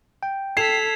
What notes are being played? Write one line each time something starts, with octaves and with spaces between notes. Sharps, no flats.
G5
A4 G#6 B6 C7 E7 F7